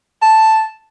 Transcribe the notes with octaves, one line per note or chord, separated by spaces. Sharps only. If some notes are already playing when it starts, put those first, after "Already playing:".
A5